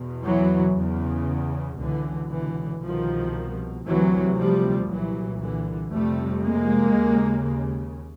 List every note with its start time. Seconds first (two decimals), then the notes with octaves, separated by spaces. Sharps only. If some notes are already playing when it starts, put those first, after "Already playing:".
Already playing: E2 B2
0.24 E3 F#3
0.75 E2 C#3
1.79 C#2 B2 D3 E3
2.30 D3 E3
2.82 C2 B2 D#3 F3
3.85 D2 C3 E3 F#3
4.37 F3 G3
4.88 C2 A#2 E3 F#3
5.40 D3 E3
5.92 F2 C3 G3 A3
6.44 G#3 A#3
6.95 D#2 C#3